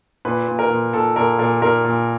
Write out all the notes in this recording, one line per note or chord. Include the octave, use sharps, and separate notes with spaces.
A#2 B4
A#2
A#4
A#2
A#2 A4
A#2 A#4
A#2 A#4
A#2 A#4
A#2